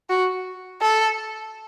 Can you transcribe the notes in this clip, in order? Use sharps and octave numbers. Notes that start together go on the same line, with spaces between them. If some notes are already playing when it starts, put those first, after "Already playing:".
F#4
A4